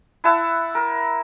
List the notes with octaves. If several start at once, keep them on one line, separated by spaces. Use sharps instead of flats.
E4 F#5 A5 E6
A#4